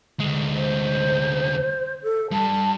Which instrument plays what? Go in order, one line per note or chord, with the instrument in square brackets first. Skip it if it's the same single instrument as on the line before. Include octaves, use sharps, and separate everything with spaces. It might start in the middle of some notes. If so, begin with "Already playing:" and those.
[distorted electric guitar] D2 G#3
[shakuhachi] C5
A4
[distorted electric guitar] G2 [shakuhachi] A5